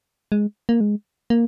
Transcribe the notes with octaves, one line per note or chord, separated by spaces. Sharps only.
G#3
A#3
G#3
A#3